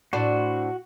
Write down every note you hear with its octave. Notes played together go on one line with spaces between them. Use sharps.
A2 D4 F#4 C5